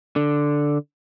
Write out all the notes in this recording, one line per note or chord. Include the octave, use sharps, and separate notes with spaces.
D3